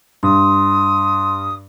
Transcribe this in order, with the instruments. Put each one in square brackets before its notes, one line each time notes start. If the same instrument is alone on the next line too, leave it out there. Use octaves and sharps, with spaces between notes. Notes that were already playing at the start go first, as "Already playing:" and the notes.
[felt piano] G2 [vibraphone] C6 [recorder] D#6